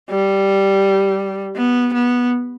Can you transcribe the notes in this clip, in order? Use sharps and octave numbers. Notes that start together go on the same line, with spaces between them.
G3
B3
B3